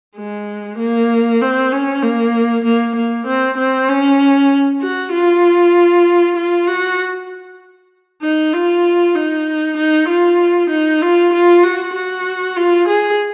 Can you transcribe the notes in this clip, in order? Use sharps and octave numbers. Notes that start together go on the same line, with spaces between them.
G#3
A#3
C4
C#4
A#3
A#3
A#3
C4
C4
C#4
F#4
F4
F4
F#4
D#4
F4
D#4
D#4
F4
D#4
F4
F4
F#4
F#4
F4
G#4